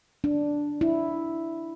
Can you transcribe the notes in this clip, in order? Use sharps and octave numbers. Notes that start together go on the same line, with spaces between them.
D4
E4